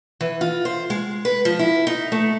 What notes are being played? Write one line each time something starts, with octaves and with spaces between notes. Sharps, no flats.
E3
F4
C5
G#3
B4
F3
E4
D#4
A3